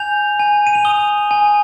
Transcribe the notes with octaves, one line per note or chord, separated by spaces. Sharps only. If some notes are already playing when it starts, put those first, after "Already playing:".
Already playing: G#5 G6 F7
G#5
D#7
F7
D#6 G7
G#5